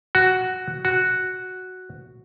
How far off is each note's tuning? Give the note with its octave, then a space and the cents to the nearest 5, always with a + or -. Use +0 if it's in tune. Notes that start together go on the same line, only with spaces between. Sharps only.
F#4 +5
F#4 +0